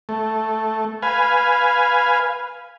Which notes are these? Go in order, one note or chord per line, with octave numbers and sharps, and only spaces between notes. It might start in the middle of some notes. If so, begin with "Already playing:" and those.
A3
B4 F5 G#5